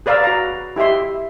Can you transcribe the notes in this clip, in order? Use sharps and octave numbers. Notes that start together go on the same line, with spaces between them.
G#4 B4 D5 F5 A#5 E6
F#4 A#5
E4 G4 D#5 E5 C6